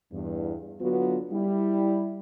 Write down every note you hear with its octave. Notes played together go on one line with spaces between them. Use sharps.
E2 G2
D3 F#3 B3 F4 F#4
G3 E4